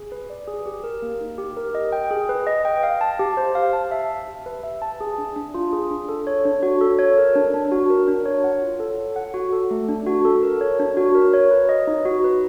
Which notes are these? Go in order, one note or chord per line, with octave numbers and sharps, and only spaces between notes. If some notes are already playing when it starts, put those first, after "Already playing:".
Already playing: G#4
B4
D5
G#4
G4
A#4
A#3
D#4
G4
A#4
D#5
G5
G#4
B4
D#5
G5
F5
A5
G4
C5
F5
A5
E5
A5
G4
B4
E5
A5
G#4
D4
D4
F4
G#4
D4
A4
C#5
D4
F#4
A4
C#5
A#4
D4
D4
F#4
A#4
D4
C#5
F#5
F4
A4
C#5
F#5
F#4
A4
A3
D4
F#4
A4
A#4
C#5
D4
F#4
A#4
C#5
B4
D#5
D#4
F#4
B4